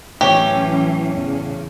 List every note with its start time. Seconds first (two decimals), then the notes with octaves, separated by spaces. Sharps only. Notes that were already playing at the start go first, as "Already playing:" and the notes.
0.21 A2 E3 F#3 C#4 G4 C#5
1.13 E2 C#3